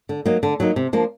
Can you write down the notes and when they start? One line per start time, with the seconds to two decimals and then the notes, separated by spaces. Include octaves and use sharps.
0.09 D3
0.25 F#3 A#3 D#4
0.43 D3
0.60 F#3 A#3 D#4
0.76 C3
0.93 F3 A#3 D4